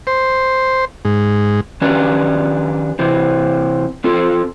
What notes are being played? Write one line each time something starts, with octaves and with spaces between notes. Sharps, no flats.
C5
G#2
D#3 C#4 D4 G4 B4
C3 E3 C4
C4 F4 A4